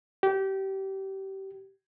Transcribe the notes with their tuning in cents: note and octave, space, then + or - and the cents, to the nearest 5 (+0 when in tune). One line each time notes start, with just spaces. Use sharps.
G4 -25